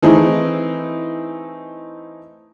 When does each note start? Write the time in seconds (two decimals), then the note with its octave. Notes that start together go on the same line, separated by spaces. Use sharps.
0.02 E3 A3 C4 D#4 E4 G#4